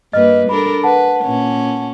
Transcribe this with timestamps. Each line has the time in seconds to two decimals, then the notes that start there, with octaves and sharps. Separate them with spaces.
0.13 G2 A#3 B4 D#5 F6
0.49 D4 A4 A#4 B5
0.83 B4 F#5 A5
1.22 A#2 C#4